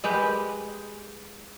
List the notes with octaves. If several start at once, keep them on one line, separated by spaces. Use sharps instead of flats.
G#3 G4 B4